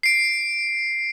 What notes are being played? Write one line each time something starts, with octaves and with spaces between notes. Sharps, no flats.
C7 D7